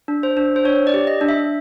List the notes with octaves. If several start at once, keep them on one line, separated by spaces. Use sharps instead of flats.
D4
C5
D4
C5
D4 C#5
D5
G4
D#5
D4
E5